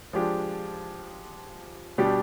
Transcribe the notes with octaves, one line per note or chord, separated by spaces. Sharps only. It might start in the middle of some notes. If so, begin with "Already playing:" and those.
F3 G#3 D4 G4
B2 G3 D4 G4